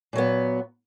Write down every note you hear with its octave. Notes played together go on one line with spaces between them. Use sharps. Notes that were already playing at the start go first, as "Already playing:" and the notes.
A#2 F#3 B3